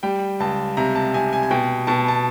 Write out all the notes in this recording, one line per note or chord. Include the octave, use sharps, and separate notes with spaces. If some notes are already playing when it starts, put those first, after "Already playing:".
G3 G5
C#2 A5
C3 A#5
A5
C3 G#5
G#5
G#5
B2 G5
B2 A5
A5